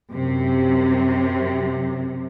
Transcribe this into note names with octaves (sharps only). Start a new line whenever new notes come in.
F#2 C3